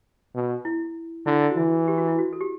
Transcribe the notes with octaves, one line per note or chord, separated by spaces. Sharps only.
B2
E4
D3 E4
E4
F#4
E3 E4
G4
F#4
E4
F#4
A4
G4